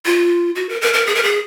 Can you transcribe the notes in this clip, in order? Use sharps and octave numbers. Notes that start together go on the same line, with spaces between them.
F4
F#4
A#4
A#4
A#4
G#4
A#4
G#4